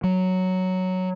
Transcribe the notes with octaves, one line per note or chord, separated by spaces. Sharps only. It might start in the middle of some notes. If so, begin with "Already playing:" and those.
F#3